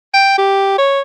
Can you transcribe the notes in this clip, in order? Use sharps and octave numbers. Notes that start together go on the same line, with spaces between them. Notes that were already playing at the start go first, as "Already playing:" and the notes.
G5
G4
C#5